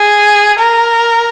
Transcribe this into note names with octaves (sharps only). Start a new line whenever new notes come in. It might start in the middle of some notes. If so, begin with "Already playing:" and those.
Already playing: G#4
A#4